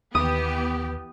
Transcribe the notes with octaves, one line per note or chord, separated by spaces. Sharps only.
D#2 E3 B3 G4 D#6